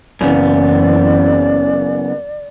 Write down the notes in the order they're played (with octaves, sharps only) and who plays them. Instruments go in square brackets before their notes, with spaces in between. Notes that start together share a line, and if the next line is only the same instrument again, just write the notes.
[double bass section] F#1 E3 C4 [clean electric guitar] F#2 C#3 B3 [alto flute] D5